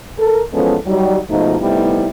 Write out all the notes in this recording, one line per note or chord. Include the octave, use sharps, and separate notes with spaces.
A4 A#4
E3 F3 G#3 B3 C#4 A4
F#3 G3 D#4
G#2 B2 F3 A3 D#4 F4
C3 G3 A3 B3 D#4 E4